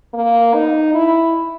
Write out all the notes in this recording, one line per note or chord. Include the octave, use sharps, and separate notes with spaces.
A#3
D#4
E4